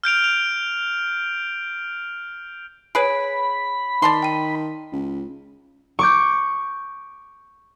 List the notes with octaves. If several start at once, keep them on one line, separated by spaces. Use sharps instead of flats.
F6 G6 D7 F7
F7
G#4 B4 C#5 B5 D7
D#3 D5 A5 C6
G5 D#7
C#2
C#6 D6 G6